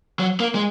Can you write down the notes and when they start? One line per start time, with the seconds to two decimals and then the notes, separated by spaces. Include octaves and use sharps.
0.19 F#3
0.40 A#3
0.55 G#3